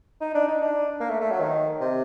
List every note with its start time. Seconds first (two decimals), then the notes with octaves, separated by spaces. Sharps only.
0.21 D#4
0.35 D4
0.48 D#4
0.61 D4
1.00 A#3
1.10 A3
1.21 A3
1.31 F#3
1.40 D#3
1.80 C3